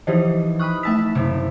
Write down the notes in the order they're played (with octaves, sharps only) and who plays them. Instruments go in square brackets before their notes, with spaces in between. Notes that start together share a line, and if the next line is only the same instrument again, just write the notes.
[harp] E3 F3 D#4 [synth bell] G4 C5 D#5
[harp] B5 D#6 F#6 [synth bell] C#6 F6
[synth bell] A3 B6 [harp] E5 A5 E6
[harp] F#1 C3